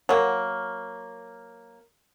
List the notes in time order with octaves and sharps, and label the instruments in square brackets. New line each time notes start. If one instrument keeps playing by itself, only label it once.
[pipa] F#3 A#3